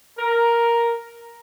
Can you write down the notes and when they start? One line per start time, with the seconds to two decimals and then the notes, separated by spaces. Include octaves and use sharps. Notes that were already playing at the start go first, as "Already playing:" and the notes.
0.19 A#4